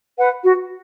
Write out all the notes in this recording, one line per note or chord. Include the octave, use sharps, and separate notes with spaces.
B4 F#5
F#4